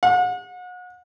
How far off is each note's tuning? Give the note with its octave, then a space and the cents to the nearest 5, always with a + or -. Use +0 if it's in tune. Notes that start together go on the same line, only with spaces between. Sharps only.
F#5 -35